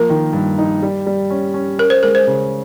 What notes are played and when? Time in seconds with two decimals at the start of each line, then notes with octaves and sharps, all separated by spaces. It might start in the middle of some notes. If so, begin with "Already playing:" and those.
Already playing: F3 A#3 A#4
0.10 D#3
0.33 G2
0.58 D#4
0.83 G3
1.06 G3
1.30 C#4
1.54 C#4
1.79 C#4 A#4
1.90 C5
2.03 G#3 A#4
2.15 C5
2.27 C#3